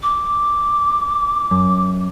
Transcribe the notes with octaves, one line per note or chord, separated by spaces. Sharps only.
D6
F#2